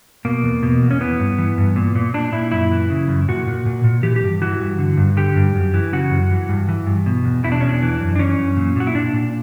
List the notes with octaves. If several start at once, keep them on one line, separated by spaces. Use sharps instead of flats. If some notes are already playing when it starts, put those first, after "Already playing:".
B2 A#3
E2
B2
E2
C#4
E3 B3
G2
E3
G2
A#2
A#2
A#2 D4
A#2 E4
F#2 E4
E3
C#3
F#2
A#2 F#4
A#2
A#2
A#2
E3 G4
G4
G2
E3 F#4
G2
D3
G2
D3 G4
G2
F#2
E3
C#3 F#4
F#2
E3
G2
E3
G2
B2
E2
B2 E4
D4
E2 C#4
D4
E3
F#2
D4
E3 C#4
F#2
A#2
A#2 F#4
E4
A#2 D4
A#2